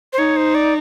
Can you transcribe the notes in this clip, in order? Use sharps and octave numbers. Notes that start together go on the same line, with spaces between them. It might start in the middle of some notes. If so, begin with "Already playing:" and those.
C5
D#4 C#5
C5
D5